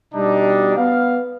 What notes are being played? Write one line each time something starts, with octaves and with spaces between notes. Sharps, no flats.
B2 G3 D4 D#4
B3 F5